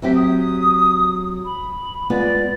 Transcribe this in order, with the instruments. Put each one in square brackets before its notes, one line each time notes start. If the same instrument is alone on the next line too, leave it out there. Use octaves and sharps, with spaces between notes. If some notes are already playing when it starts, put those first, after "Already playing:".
[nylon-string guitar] F#3 C4 G4 [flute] E5
[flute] D#6
B5
[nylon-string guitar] G#3 B3 F4 [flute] D5